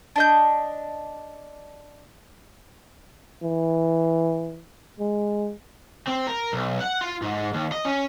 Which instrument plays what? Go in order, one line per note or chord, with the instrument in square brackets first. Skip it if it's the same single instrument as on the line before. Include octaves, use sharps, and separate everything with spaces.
[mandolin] D4 D#5 G6
[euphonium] E3
G#3
[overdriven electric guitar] C4
A#4
B1
F#5
F4
G#2
D#2
D#5
C#4